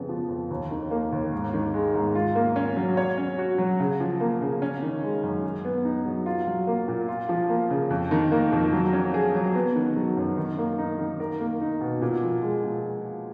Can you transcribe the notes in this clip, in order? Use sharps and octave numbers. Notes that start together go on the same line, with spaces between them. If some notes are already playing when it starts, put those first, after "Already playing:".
Already playing: F2 C#3 B3
F3
F2
D#2
D#3
A#3
D#2
G#2
D#3
G#3
G#2
F4
A#3
C#4
F#3
C#5
C#4
F#4
F#3
C#3
F3
A#3
C#3
C#4
D#3
G#3
F#2
G#4
B3
D#4
F#3
F4
F#3
A#3
A#2
F4
F3
A#3
C#3
F2
D#3
A#3
F2
F#3
C#4
G#4
F#3
B3
D#3
F#3
F#2
D#3
A#3
D#4
D#3
A#4
A#3
D#4
B2
A#2
F3
G#3
A#2